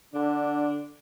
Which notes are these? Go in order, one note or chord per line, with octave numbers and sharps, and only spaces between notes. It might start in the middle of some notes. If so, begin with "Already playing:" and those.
D3 D4